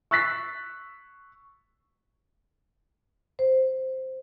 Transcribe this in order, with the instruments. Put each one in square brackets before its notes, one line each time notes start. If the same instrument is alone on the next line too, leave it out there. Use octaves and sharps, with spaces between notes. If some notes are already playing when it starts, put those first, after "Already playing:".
[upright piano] C#6 E6 F#6 A6 B6 C7
[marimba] C5